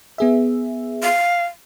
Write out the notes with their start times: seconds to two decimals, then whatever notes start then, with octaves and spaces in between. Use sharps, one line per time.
0.18 B3 G#4 E5
1.03 F5